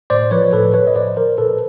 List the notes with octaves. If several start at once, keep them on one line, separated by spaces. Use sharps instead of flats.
A2 C5 D5
F3 B4 C#5
A2 A4 B4
F3 B4 C#5
D#5
A2 C5 D5
F3 A#4 C5
A#2 A4 B4